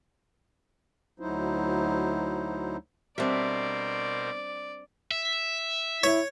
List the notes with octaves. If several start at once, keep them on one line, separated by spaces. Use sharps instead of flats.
D2 F#3 D#4 E4 C5
B2 G3 C4 D4 A#4 C5 D5 E5
E5
E4 C#5